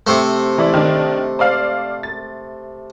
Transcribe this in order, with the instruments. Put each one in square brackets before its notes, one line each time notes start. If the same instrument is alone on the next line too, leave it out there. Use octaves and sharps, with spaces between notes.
[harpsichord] C3 A3
[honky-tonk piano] E3 E4 D5
D#3 D4
C5 D5 F5
A6